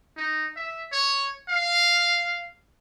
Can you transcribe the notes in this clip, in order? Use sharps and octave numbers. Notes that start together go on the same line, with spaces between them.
D#4
E5
C#5
F5